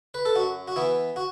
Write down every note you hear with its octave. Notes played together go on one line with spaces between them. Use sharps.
B4
A4
F#2 F#4
F#4
E3 B3 E4
F#4